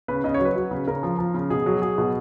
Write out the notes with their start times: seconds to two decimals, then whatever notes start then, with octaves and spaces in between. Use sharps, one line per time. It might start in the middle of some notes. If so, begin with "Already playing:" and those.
0.08 C#3 B4
0.24 C#3 D#5
0.34 C#5
0.40 F#3
0.45 B4
0.56 F#3
0.71 C#3
0.87 C#3 A#4
1.03 F3
1.19 F3
1.34 C#3
1.50 B2 G#4
1.66 F#3
1.82 F#3 G#4
1.98 B2